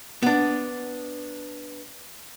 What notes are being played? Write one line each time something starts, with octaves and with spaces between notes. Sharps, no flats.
B3 D4